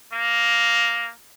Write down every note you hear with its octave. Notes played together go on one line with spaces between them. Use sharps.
A#3